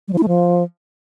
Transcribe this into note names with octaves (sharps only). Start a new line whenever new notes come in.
G3
F3
E4
A3
F3